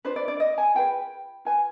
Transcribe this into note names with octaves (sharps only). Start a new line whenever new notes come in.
D4 F4 B4 C5
D5
D5
D#5
G#5
F4 G#4 B4 G5
F4 B4 G#5